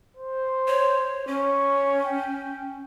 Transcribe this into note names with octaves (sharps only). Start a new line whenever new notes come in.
C5
C#5
C#4 C#5
G5